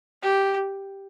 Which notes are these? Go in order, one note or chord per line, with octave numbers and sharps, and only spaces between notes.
G4